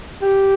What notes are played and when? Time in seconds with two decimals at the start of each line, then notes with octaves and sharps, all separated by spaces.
0.22 G4